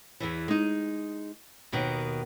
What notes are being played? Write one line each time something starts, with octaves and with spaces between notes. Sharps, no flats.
E2 G#2 E3
G#3 D#4
D#2 B2 D#3 B3